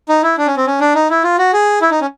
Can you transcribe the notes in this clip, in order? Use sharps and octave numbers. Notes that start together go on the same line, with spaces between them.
D#4
E4
D4
C#4
C4
C#4
D4
D#4
E4
F4
F#4
G#4
E4
D#4
C#4